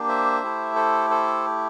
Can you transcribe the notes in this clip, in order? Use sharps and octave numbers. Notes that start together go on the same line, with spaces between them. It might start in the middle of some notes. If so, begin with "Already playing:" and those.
Already playing: A#3 D4 G4
C5 E5
A3 E4 G4
A4 C5
A4 C5